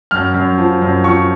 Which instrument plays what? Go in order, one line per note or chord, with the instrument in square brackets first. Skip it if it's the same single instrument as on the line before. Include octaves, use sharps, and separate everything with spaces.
[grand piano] F#2 F6
F#2
F3
F#2
F3 C#6